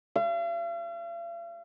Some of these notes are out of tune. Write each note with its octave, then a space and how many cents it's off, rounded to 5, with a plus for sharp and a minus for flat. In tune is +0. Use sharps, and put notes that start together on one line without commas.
F5 -45